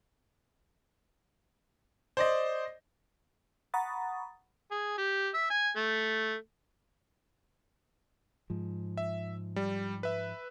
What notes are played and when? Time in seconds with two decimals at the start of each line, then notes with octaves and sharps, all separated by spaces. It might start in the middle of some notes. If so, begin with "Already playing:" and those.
2.17 C5 D5 D#5
3.74 F#5 A#5 B5 C#6 D#6 A6
4.71 G#4
4.98 G4
5.34 E5
5.50 G#5
5.76 A3
8.50 G#2 F3
8.97 E5
9.56 G3
10.03 B4 E5